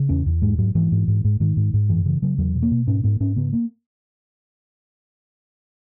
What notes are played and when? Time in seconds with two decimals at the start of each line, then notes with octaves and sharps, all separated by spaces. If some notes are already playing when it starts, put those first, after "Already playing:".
Already playing: C#3
0.09 E2 C#4
0.26 E2
0.42 G#2 G#3
0.58 G#2 F#3
0.75 G#2 E3
0.92 G#2
1.08 G#2
1.24 G#2
1.40 G#2 D#3
1.57 G#2
1.74 G#2
1.89 F#2 E3
2.06 C#3 E3
2.22 C#3 F#3
2.38 E2 F#3
2.55 B2
2.62 A#3
2.71 B2
2.87 G#2 C#4
3.04 G#2 B3
3.20 G#2 C#4
3.36 C#3 B3
3.53 A#3